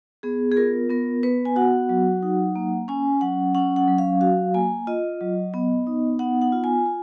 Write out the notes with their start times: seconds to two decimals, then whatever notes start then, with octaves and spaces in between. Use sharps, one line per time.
0.23 B3 G#4
0.52 G#4
0.56 F4 A#4
0.90 B3 A#4
1.23 B3 B4
1.45 G#5
1.56 F#4 F#5
1.89 F#3
2.23 D#4
2.56 A#3
2.88 C#4 G#5
3.21 F#3 F#5
3.55 C#4 F#5
3.76 F#5
3.88 F#3
3.98 F5
4.21 F#4 F5
4.54 A#3 G#5
4.87 F4 D#5
5.21 F#3
5.54 B3
5.87 D#4
6.19 B3 F#5
6.42 F#5
6.52 F4
6.64 G#5
6.86 F4